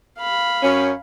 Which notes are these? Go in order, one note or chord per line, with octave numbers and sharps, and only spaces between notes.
F5 B5
F#2 C#4